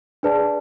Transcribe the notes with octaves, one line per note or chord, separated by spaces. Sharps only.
D4 G#4 B4 D5 A5